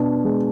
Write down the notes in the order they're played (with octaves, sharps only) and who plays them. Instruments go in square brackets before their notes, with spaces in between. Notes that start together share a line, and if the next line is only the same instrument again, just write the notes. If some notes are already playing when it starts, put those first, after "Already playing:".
Already playing: [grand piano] B2 D4
G#3